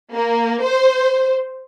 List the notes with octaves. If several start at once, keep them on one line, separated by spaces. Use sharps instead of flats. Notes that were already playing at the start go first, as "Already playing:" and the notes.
A#3
C5